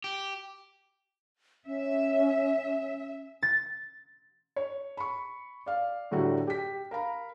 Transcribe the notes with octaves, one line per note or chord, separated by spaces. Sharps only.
G4
C#4 E5
A6
C#5
B5 C#6
D5 F5
A2 D3 F#3 G3 A3 F#4
G4 B6
A#4 F5 A#5 B5